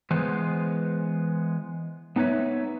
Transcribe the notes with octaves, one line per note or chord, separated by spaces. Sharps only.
E3 G#3 B3 C5
B3 D#4 B4 C#5 E5